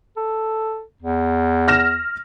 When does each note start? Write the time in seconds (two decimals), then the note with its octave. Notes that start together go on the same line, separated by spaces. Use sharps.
0.17 A4
1.02 E2
1.68 F6 A#6 E7